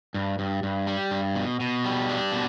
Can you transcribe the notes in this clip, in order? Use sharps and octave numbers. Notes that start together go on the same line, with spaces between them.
G2
G2
G2
G3
G2
B2
B2
G3
D4
B2